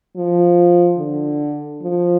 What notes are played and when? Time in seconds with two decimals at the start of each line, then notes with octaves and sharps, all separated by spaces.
0.16 F3
0.99 D3
1.82 F3